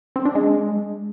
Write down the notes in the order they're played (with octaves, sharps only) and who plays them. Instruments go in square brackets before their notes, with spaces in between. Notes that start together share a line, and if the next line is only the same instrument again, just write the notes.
[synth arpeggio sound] C4
D4
G#3